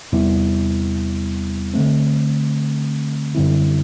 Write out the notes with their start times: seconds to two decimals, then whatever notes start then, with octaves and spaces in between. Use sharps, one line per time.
0.12 E2 C3 G3 B3 E4
1.74 D3 A3 C4
3.35 F#2 D3 G3 C4 E4